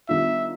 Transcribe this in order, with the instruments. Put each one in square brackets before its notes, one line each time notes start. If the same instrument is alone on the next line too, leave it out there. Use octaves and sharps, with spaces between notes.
[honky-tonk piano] D#3 G3 B3 D4 F4 [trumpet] E5